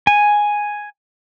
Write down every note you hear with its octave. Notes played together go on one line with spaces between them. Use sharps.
G#5